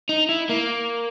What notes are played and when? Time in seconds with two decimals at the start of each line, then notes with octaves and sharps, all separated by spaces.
0.09 D#4
0.29 E4
0.49 A#3